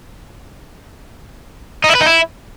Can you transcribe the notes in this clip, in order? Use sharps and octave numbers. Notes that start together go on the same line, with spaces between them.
D#4
E4
B4
D#4
E4